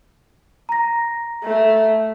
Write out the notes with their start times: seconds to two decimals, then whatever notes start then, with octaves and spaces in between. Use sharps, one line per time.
0.69 A#5 A#6
1.44 A3